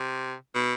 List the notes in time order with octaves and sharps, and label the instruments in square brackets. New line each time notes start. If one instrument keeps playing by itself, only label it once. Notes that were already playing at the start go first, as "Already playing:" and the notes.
Already playing: [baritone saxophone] C3
B2